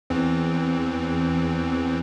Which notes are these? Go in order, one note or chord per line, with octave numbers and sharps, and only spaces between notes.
E2 E3 C4